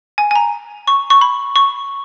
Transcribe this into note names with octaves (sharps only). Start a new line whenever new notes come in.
G#5
G#5
A#5
C#6
C#6
B5
C#6